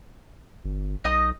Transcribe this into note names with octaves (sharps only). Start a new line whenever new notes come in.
G1
B1 D#4 D#5 D#6